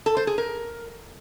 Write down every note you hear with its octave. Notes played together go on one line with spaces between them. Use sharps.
A4
C5
G#4
A#4